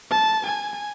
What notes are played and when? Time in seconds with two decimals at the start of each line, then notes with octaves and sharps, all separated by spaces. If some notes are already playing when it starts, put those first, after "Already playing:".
0.11 A5
0.46 G#5